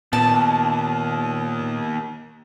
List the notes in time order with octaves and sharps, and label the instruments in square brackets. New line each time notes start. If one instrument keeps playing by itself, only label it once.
[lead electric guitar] D#2 [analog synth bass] A#2 [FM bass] B3 [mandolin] A5